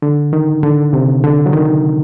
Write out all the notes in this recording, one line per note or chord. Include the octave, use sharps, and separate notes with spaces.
D3
D#3
D3
C3
D3
F#3
D#3